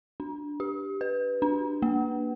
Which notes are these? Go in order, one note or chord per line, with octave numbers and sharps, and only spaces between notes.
D4
G4
B4
D4
A#3